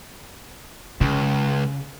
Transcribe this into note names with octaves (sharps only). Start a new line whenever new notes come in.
C#2 C#3